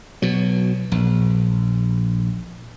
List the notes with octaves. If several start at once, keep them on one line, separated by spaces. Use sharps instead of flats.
B2 F#3
A#1